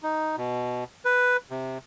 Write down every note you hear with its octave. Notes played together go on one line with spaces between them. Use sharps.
D#4
B2
B4
C3